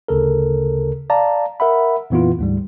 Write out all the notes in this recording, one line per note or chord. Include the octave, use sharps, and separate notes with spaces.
D2 C#3 A4 A#4
D5 F5 A5 A#5
A#4 E5 F#5 B5
F2 A#2 E3 B3 E4 F4
D2 G#2 G3